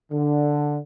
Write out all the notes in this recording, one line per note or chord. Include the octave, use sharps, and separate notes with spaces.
D3